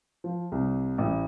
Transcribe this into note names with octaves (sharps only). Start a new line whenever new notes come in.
F3
C2
A1